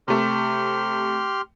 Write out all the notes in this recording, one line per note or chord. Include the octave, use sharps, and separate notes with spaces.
C3 A3 G4 C6 F6